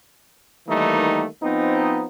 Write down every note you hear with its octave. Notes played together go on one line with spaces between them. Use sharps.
D#3 E3 G3 A3 A#3 D#4
F3 B3 C4 D#4